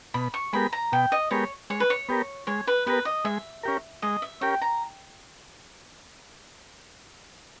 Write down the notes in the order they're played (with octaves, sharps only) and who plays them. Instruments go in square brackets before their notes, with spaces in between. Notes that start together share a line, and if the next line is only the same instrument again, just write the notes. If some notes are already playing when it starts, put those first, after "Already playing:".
[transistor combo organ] B2 [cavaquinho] B5
[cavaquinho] C#6
[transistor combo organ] G#3 B3 G4 A#4 [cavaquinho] B5
[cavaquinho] A#5
[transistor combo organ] B2 [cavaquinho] G5
[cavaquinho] D#5
[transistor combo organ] G#3 B3 G4 A#4 [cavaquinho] C#5
[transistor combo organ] G#3 [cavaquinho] C#5
[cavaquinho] B4
C#5
[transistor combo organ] B3 G4 A#4
[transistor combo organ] G#3 [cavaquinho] C#5
[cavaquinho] B4
[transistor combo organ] B3 G4 A#4 [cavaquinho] B4
[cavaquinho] D#5
[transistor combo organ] G#3 [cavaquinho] E5
[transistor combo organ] C#4 G4 A#4
[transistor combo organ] G#3 [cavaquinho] D#5
[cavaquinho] E5
[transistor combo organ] C#4 G4 A#4 [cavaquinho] G5
[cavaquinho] A#5